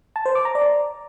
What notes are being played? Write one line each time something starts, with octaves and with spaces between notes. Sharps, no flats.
A5
C5
D6
A#5
D5